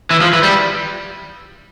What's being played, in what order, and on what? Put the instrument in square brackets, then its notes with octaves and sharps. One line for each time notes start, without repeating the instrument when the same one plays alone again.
[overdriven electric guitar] E3
F3
E3
G3